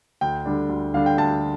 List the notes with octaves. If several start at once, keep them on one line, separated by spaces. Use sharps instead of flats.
D2 G5
D3 G3 D4
D2
D3 G3 D4 F5
G5
D2 A5